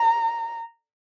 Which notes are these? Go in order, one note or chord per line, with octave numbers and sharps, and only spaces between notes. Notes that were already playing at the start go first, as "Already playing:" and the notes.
Already playing: A#5